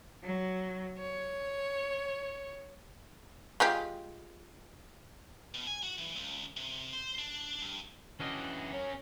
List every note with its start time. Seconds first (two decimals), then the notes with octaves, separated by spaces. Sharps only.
0.23 F#3
0.97 C#5
3.60 G#3 F4 G4
5.54 B2
5.67 G#5
5.83 F#4
5.98 E3
6.16 C#2
6.57 C3
6.93 C5
7.19 D4
7.61 G2
8.20 E3 C#4 D4 F#4 D#5
8.73 C#4 A#4 C#5